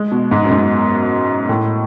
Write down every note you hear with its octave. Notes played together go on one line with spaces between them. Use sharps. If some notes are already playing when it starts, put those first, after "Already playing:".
Already playing: G#3
B2
G#2
F#2
G#2
A2